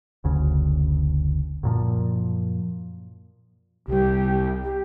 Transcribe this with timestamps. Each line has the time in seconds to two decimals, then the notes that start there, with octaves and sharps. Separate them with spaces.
0.24 F#1 D2 C#3
1.63 F#2 A#2 F3
3.88 C2 G3 G4
4.63 G4